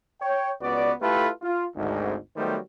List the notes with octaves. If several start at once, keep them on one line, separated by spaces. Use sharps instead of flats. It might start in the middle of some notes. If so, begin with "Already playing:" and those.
C#5 G5
C#2 B3 F#4 B4 D5
A3 E4 F4 G4 A4 B4
F4
G#1 D2 G#2
D#3 F#3 G3 A3 B3 C5